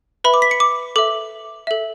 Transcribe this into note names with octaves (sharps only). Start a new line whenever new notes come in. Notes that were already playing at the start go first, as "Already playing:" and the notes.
B4 E5 B5
D6
B6
C#7
D6
A4 E5 D6
A4 E5